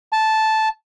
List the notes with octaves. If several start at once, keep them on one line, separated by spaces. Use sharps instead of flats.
A5